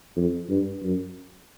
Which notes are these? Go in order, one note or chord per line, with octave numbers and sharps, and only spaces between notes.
F2
G2
F#2